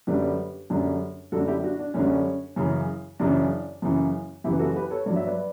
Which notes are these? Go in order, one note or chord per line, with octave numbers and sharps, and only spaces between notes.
F#2 D3 G3 G4 B4
F#2 D3 G3
F#2 D3 G3 F#4 A4
E4 G4
D4 F#4
D4
F#2 D3 G3 C#4
F#2 C#3 E3
F#2 C#3 E3 D4
F#2 C#3 E3
F#2 C#3 E3 E4 G4
B4
F#4 A4
G4 B4
A4 C#5
G2 F#3 D5
E5
B4 D5